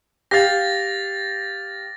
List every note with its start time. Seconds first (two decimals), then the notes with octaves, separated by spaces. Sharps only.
0.31 G4 F5 A6 A#6